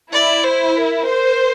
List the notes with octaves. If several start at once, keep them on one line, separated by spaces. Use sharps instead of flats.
E4 D5
C5
A#4
C5